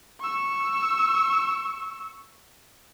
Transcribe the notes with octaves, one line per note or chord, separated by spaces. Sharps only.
C#6 E6